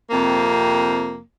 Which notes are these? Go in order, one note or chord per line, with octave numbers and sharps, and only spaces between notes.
F2 C3 A#3